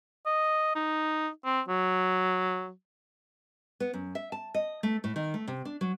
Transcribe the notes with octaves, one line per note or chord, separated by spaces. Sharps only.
D#5
D#4
C4
F#3
B3
F#2
E5
A5
D#5
A3
A2
D#3
A3
C3
D4
F#3